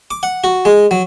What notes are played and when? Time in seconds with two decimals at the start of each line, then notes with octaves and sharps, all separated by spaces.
0.11 D6
0.23 F#5
0.44 F#4
0.65 G#3
0.91 F#3